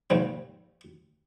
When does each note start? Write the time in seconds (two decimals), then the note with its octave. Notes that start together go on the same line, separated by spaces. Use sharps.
0.10 A#1 D#2 G#2 C3 G3